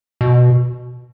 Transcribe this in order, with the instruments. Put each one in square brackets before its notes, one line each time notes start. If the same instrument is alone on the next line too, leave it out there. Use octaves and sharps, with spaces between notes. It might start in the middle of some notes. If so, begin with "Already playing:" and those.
[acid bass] B2